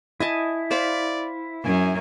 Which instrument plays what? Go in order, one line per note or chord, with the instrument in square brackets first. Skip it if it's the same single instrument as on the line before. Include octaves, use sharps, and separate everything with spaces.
[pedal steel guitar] E4 [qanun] D#5 G#5 A5
[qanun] C5 F5 B5 [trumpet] D5
[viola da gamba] F#2 [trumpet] G#5